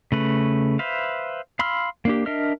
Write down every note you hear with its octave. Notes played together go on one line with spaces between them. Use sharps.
C#3 A3 B4
B4 C5 E5 F5
F5 B5 C6 E6 F6
A#3 D4 G4
D4 A#4 D#5 E5 F6